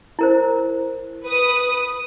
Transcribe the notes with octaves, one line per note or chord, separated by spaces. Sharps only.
E4 A#4 C5
B4 D#6